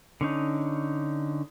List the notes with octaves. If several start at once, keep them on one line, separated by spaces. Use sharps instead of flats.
D3 C#4 D#4